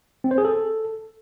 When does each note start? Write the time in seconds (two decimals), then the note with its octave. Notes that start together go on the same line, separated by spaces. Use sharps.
0.24 C4
0.31 C5
0.38 G#4
0.45 A4